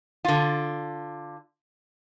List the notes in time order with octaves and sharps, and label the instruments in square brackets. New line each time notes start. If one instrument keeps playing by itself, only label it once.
[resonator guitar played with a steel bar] D3 F4